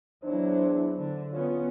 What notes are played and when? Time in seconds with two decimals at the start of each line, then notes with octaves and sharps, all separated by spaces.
0.24 E2 F#3 D4 E4 C5
0.98 D3
1.32 B3 C#4 F4